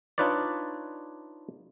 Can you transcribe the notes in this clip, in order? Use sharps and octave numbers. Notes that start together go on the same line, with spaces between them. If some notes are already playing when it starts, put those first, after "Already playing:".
D4 D#4 F4 B4 C#5 D5